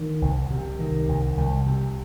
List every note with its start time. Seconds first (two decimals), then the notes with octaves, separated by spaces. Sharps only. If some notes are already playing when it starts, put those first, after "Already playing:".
Already playing: D#3
0.22 C2
0.50 C3
0.79 D#3
1.09 C2
1.37 C2
1.66 C3